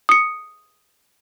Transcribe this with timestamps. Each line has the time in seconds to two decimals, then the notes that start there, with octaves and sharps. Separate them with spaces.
0.09 D#6 C#7